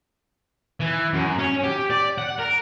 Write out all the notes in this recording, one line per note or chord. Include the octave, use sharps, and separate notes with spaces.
E3
F#2
C#4
G4
D5
F#5
A#4